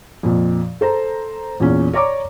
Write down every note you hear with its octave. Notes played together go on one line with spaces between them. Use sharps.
F2 A#2
A4 C5 A#5
E2 A#2 C#4
C#5 D5 A#5 C#6 D6